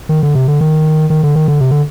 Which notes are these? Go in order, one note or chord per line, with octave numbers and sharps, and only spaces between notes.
D#3
D3
C3
D3
D#3
D#3
D3
D#3
D3
C3
D3